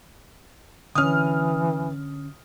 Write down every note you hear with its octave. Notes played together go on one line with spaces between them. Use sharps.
D3 E3 C#4 D#6 F6